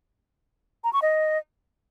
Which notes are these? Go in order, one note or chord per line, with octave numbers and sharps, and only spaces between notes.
A#5
C#6
D#5